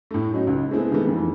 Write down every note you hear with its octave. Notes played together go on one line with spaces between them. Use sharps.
A2 A3
F#3 C#4 D#4 F#4
C#2
G#3 A3 B3 C4 E4 G#4
C3 D#3 G#3 A3 B3
F2 E3 F3